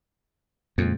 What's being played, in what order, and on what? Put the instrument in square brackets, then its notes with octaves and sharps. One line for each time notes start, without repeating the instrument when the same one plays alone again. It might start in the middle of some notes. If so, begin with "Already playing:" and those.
[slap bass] F2 [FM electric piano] A#2 C#3 G#3